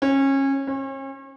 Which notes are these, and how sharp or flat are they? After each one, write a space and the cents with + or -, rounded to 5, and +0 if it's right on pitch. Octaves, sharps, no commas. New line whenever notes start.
C#4 -25
C#4 -40